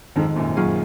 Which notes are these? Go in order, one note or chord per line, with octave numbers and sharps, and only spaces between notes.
F2 G#2 D#3
F#2 A#2
F#2 A#2 F#3 A#3 F4 G#4